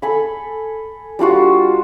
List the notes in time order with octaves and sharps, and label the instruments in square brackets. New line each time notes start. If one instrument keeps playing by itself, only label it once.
[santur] A4 G#5 B5
G3 D4 F4 F#4